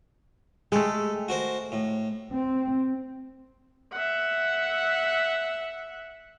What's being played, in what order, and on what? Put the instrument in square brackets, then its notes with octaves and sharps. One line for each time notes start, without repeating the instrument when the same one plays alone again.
[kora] G#3 A3 [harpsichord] G4 A4
[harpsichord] F#4 A#4 C5
A2
[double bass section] C4
[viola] E5 F#5